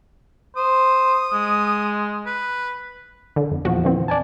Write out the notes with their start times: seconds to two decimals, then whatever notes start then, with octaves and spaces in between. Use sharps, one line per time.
0.56 C5 D#6
1.32 G#3
2.26 B4
3.36 D3
3.51 F2
3.65 E2 A#2 F3 F#4
3.84 D3 E3 C4
4.08 D5 G#5 A5